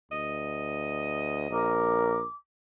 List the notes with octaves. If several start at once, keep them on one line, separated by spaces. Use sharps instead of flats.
D2 D#5
A#1 A#4 D6